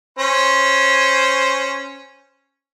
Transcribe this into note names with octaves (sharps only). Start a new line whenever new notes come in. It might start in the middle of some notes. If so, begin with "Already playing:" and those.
C#4 C5